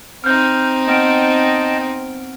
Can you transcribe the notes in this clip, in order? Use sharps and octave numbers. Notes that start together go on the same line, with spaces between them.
C4 D#4 F6 G6
B3 D#5 G5 A5 F6 D7